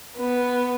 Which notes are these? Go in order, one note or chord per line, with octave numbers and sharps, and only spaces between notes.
B3